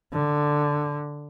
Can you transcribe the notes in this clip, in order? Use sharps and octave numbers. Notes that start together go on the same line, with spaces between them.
D3